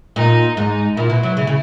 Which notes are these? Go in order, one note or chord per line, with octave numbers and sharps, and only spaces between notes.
A#2 D#4
G#2 D#4
A#2 E4
B2
F#3
C#3
C#3